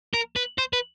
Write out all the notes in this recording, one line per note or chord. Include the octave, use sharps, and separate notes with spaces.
A#4
B4
C5
B4